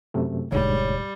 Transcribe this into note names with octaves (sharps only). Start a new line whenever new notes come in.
F#2 C3 A3
E1 D2 G#2 G3 C#5